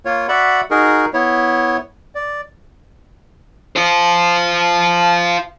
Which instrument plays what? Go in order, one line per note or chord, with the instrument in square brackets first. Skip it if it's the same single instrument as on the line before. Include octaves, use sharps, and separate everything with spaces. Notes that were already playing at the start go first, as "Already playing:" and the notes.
[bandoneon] A#3 F4 C#5
F#4 D5 E5 F#5 B5
D#4 F#4 G#4 A#4
B3 E4 C#5
D5
[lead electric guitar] F4 C5